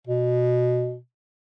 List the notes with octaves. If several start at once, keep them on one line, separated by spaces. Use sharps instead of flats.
B2